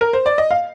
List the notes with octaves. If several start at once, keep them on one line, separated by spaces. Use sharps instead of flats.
A#4
C5
D5
D#5
F5